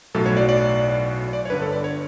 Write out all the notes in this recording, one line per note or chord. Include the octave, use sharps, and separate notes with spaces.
B1 A2 F#3 A4
C#5
D5
D5
D5
C#5
G1 G2 D3 G3 B4
A4
D5
C#5